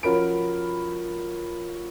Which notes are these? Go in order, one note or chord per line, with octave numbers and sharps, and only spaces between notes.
F3 C#4 F#4 A#4 B5 D7